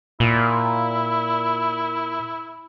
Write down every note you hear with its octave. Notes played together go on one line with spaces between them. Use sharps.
A#2 E4